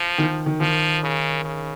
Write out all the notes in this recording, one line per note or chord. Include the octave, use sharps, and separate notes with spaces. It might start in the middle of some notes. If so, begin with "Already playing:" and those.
Already playing: F3
D#3
D#3
D#3 F3
C#3
C#3